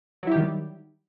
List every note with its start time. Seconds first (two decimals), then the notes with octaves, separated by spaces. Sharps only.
0.23 F#3
0.27 E4
0.31 G4
0.36 D#3
0.40 G3